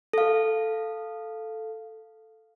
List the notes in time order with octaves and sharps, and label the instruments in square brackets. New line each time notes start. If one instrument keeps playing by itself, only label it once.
[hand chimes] A4 F5